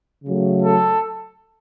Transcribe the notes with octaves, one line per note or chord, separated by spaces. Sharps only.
C#3 F#3 A3
A4